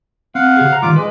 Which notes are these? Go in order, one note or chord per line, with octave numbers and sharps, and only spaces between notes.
C4 F5 F#5
C#3 G4 G#4
C5 A#5
D#3 F3 G3 F4 D6
G#3 B4